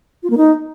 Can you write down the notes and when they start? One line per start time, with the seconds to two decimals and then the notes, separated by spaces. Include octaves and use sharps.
0.23 F4
0.30 A#3
0.37 D#4